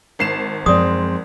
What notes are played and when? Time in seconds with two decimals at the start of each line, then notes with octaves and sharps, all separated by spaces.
0.19 G#1 C7 E7
0.66 F#2 F3 G#3 C4 D5 D#6